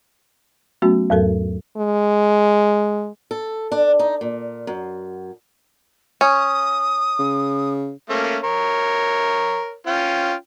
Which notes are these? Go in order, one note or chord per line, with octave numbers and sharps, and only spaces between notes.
F#3 A3 B3 C#4 F#4
E2 G#2 F#3 A4 A#4
G#3
A4
D4
D#4
A#2
F#2
C#4 D#6
C#3
A3 A#3 C#4
A#4 C#5
C#4 F4 G5